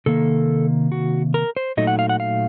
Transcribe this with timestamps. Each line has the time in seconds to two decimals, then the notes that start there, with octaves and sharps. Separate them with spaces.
0.06 C3 D#3 A#3 A4
0.92 F#4
1.34 A#4
1.57 C5
1.77 A#2 F#3 A3 D#4 D#5
1.87 F#5
1.99 F5
2.09 F#5
2.20 F5